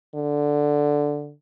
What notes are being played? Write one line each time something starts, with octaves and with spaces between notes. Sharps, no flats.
D3